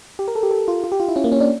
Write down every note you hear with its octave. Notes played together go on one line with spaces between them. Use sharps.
G4
A#4
A4
G4
A4
F4
F4
G4
F4
E4
C#4
A#3
C#4
D4